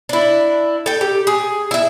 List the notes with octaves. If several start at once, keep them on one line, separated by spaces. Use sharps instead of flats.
D4 E4
A4 G5
G4
G#4
E4 E5